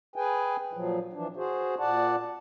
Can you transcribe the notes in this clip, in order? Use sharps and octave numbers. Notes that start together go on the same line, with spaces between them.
G#4 B4 G5 G#5
A#2 F3 F#3
E3 F3 D4
F#4 G#4 C5
A#2 D5 F#5 A5